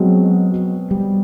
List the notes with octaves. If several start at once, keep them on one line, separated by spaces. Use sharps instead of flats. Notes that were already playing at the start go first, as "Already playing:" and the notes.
Already playing: B2 F#3 G#3 C4
G3